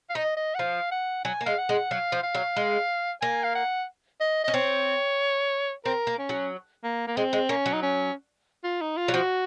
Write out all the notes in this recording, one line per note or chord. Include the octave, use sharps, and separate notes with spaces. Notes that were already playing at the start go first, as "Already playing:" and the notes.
F5
D#4 D#5
D#5
F#5
F3 F5
F#5
F#3 G#5
A#3
G#3 F5
F#5
G#3
F#3 F5
F3
F5
F#3
G#3
A#3 G#5
F5
F#5
D#5
C#4 D#5
C4 C#5
C4 A#4
A#3
C#4
F#3
A#3
A#3
G#3 C4
G#3
A#3 C#4
F#3
D#4
C#4
F4
D#4
F4
F#3
F3 F#4